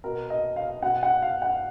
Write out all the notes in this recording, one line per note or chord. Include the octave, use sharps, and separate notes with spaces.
B2 A#4
D#5
F5
B2 F#5
F#5
F5
F#5